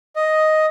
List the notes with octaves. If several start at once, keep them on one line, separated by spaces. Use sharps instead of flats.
D#5